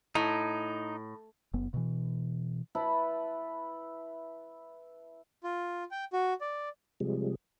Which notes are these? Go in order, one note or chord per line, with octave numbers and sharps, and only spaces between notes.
A2 D#4
F#1 B3
B2 E3
E4 B4 A5
F4
G5
F#4
D5
C3 F3 G3 G#3